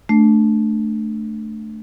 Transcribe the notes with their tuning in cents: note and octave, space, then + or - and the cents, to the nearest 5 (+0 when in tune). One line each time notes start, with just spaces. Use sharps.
A3 -5 D4 +0